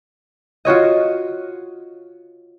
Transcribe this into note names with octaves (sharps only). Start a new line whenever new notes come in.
F4 F#4 C#5 D#5